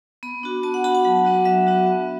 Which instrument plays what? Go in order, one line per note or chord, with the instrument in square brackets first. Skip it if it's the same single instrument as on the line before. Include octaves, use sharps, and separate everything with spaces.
[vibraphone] B3 B5
D4 F#4
B3 A5
F#5
D4 F#4 B5
A5
F#3 F#5
B3 D4 F#4
F#3 E5
B3 D4 F#4
B3